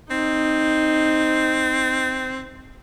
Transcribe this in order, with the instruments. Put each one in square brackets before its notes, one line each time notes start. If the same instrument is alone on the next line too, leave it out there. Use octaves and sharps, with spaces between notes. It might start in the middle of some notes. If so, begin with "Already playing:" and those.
[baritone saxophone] C4 [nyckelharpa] D#4